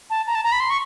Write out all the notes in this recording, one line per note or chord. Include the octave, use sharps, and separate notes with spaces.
A5
A#5
A5
A#5
B5
C6
C#6